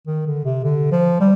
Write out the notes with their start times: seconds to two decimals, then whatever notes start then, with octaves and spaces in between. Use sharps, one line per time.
0.07 D#3
0.26 D3
0.45 C3
0.64 D3
0.91 F3
1.20 G3